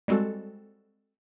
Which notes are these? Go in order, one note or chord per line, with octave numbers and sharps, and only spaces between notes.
G3 G#3 C4 F#4 A4